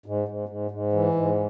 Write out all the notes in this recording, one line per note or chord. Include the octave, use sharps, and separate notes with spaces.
G#2
G#2
G#2
G#2
E3
G#2